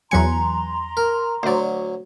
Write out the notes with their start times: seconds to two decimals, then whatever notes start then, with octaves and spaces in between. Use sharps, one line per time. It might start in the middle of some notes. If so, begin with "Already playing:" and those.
0.11 E2 F#3 B4 G#5 A#5 C6 C#7
0.97 A#4
1.43 D2 F#3 C5 D5